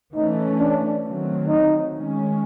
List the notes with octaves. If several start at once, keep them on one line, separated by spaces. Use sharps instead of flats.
E3 A3 C#4 D#4
D4
D#3 F#3 A3 C4
D#4
D#3 G#3 C#4